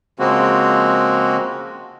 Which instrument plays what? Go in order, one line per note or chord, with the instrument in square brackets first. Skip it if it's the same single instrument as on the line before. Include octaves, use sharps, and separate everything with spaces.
[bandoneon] C#3 F3 G#3 A#3 C4 F#4